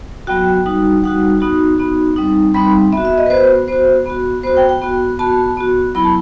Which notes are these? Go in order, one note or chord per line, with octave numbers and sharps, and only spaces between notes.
F#3 B3 F#4 G5
G3 D#4 F#4
G3 D#4 F#4 F#5
B3 D#4 F#4
B3 D#4 F#4
G3 C4 D#4
G3 C4 D#4 B5
B3 F#4 E5
E5
D#5
B4
B3 F#4 C5
B3 F#4 C5
B3 F#4
B3 F#4 C5
G5
G5
B3 F#4
B3 F#4 A5
B3 F#4
F#3 B3 E4 B5
A5